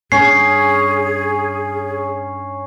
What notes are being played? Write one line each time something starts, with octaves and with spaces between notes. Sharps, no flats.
G2 C#4 G#4 C7